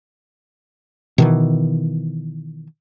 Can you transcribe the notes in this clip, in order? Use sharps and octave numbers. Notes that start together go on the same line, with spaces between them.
B2 D#3 E3